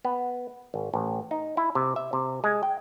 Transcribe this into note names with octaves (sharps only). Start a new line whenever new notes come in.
B3
G#1
A1
D#4
E4
C3
E5
C3
G#3
G5